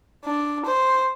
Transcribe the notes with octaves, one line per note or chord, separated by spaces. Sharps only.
D4
C5